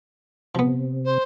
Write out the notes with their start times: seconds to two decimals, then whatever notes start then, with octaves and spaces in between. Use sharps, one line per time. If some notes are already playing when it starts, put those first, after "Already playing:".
0.55 C3 F3 B3
1.05 C5